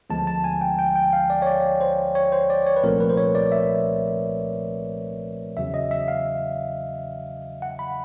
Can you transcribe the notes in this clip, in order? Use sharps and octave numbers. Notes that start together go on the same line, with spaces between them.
D2 D3 F3 G#3 B3 A5
A5
G#5
G5
G5
G5
F5
D5
C#5
D5
C5
C#5
C5
D5
C#5
B4
C2 A#2 F3 A3 C4 A#4
B4
C5
C#5
D5
E5
E2 C#3 F#3 E5
D#5
E5
F5
F#5
B5